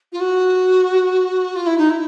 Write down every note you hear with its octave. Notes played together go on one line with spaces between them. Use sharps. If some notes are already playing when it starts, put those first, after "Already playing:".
F4
F#4
F4
E4
D#4
E4